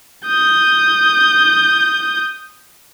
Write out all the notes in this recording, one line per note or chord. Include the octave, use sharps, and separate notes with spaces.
D#6 G6